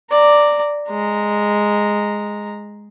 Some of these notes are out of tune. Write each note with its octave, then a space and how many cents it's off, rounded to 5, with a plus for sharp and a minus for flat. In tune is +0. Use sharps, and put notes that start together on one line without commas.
D5 +0 A#5 -15
G#3 +0 A#5 +0